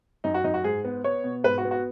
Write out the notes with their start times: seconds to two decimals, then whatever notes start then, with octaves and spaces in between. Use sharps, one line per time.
0.24 F#2 D#4
0.34 F#4
0.44 F#2 D#4
0.54 F#4
0.64 G#2 G#4
0.84 B3
1.04 B3 C#5
1.24 B2
1.44 G#2 B4
1.58 F#4
1.65 B3
1.71 F#4